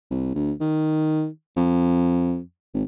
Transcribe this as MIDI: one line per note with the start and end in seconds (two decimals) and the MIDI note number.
0.11 0.30 36
0.35 0.52 38
0.61 1.27 51
1.56 2.40 41
2.74 2.83 32